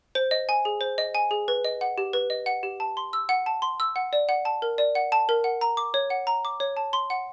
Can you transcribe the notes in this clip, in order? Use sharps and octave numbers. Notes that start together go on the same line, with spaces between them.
C5
D#5
G#5
G#4
C5
D#5
G#5
G#4
B4
D#5
F#5
G4
B4
D#5
F#5
G4
A5
C6
E6
F#5
A5
C6
E6
F#5
D5
F#5
A5
A#4
D5
F#5
A5
A#4
F#5
A#5
D6
C#5
F#5
A#5
D6
C#5
A5
C6
F#5